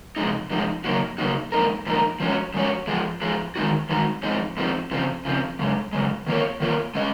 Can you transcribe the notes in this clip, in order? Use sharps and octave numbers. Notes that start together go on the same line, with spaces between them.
C3 F3 G#3 D#4
C3 F3 G#3 D#4
C#3 F#3 A#3 D#4 F#4
C#3 F#3 A#3 D#4 F#4
G#2 F3 A#3 D#4 A#4
G#2 F3 A#3 D#4 A#4
F3 G#3 C#4 F#4 C#5
F3 G#3 C#4 F#4 C#5
G#2 F3 G#3
G#2 F3 G#3
D#3 G#3 D#4 F#4
D#3 G#3 D#4 F#4
G#2 F3 G#3 C4 D#4
G#2 F3 G#3 C4 D#4
C#3 F3 C4
C#3 F3 C4
F#2 C#3 G#3
F#2 C#3 G#3
D#3 A#3 F4 A#4 C#5
D#3 A#3 F4 A#4 C#5
G#3 C#4 G#4 D#5